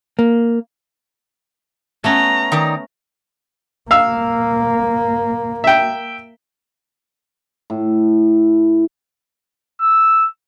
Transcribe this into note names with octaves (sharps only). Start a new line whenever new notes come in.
A#3
A3 B3 C#4 A#5
D#3 D#4 D5
A#3 F5 E6
E5 G5
A2
E6